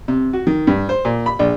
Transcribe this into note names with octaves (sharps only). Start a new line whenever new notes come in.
C3
F#4
D#3
G2
C5
A#2
B5
A#1